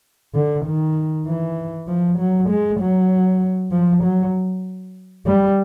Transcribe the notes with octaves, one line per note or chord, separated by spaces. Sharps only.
D3
D#3
E3
F3
F#3
G#3
F#3
F3
F#3
G3